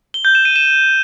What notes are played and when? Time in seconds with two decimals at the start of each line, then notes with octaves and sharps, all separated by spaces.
0.14 G7
0.25 G6
0.35 E7
0.45 D#7
0.56 E7